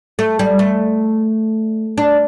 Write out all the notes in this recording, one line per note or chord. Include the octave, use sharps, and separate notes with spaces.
A3
G3
A3
D4